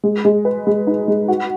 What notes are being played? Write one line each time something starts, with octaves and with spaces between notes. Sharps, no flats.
G#3
G#3
B4
G#3
D#4
G#3
F#4